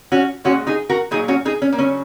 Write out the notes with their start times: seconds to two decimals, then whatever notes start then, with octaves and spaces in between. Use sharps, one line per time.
0.12 C#4 F#4
0.44 A#2 G#3 C#4 F#4
0.67 D#4 G#4
0.89 F#4 A#4
1.11 A#2 F#3 D#4 G#4
1.28 C#4 F#4
1.45 D#4 G#4
1.62 C#4
1.72 A#3
1.78 C#3 F#3 C#4